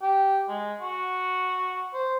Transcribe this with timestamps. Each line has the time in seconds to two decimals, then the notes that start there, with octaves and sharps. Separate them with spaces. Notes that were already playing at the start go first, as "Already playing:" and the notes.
0.02 G4
0.49 G#3
0.81 F#4
1.94 C5